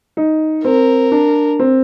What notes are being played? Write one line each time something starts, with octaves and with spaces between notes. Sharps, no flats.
D#4
C4 A#4
D4
C4